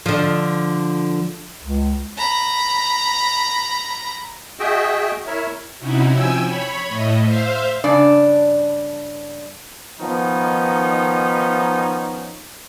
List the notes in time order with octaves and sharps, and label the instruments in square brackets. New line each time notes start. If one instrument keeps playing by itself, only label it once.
[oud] D3 F3
[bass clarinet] C#2
[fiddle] A#5 B5
[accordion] F#4 G#4 D#5 E5 G5
E4 A#4 C#5 E5
[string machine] C3 C#4 D#4 E4 F#4
F3 G5 G#5 E6
C#5 B5
A2 A3 D#5
C5 E5 F5
[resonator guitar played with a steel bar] G2 C#3 D4 D5
[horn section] D#3 F3 B3 C#4 D#4